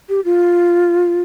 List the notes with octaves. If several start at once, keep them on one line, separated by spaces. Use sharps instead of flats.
G4
F4